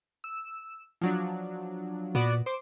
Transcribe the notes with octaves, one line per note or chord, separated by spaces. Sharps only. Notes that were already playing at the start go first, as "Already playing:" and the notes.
E6
F3 F#3 D4
A#2 B3 F#4 D5
C5 C6 D6